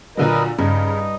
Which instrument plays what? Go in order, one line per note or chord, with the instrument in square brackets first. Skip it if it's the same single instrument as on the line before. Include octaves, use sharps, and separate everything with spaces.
[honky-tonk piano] A#2 D3 F#3 [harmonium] A#4 B4 D#5
[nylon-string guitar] G2 [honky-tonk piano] C#3 [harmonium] D#4